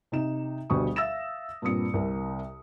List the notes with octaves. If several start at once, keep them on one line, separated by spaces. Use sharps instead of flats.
C3 D#4 E7
D2 B2 G3 C#6 D#6
E5 F5 E6 A6 A#6 E7
G2 A#2 C4 D#6 C#7
C2 C3 A#4